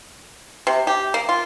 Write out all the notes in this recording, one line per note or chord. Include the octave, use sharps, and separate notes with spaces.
C3
G4
A#3
F4